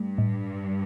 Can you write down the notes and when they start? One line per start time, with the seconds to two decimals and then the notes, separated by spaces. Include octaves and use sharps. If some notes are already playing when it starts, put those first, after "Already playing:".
Already playing: G2 A3
0.18 A2